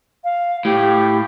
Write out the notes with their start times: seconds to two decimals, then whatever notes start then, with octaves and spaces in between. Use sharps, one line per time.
0.24 F5
0.65 A2 G4